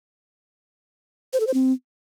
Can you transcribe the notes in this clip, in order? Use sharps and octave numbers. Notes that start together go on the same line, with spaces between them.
C5
A4
C5
C4